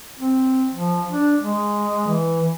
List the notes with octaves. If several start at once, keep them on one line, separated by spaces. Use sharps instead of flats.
C4
F3
D4
G#3
E3